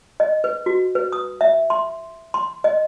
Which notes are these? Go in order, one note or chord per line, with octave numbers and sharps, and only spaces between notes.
D#5
B4
F#4
B4
D#6
E5
C6
C6
D#5